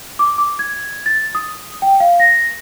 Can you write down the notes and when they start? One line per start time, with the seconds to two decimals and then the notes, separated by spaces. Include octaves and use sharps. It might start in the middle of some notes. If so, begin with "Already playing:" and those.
0.19 D6
0.38 D6
0.59 G#6
1.06 A6
1.35 D#6
1.82 G5
2.00 F5
2.20 A#6